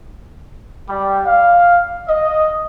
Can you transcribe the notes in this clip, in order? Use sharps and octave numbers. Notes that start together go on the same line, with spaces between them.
G3
F5
D#5